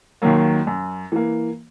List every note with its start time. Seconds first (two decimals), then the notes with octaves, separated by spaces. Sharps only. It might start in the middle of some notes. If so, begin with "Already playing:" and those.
0.22 D#2 D#3 F#3 A#3
0.67 F#2
1.12 E3 A#3